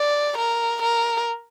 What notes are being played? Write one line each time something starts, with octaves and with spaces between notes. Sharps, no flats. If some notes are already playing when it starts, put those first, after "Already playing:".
Already playing: D5
A#4
A#4